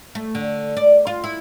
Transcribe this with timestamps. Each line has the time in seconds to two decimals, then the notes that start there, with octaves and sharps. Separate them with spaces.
0.15 A3
0.35 D3
0.77 D5
1.07 F4
1.24 E4